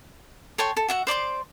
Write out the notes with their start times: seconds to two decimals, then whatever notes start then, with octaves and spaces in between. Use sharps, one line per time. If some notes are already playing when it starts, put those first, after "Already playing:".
0.58 A4 C#5 G5 C6
0.77 A4
0.88 F#4 E5 F#5
1.07 C5 D5 C6 D6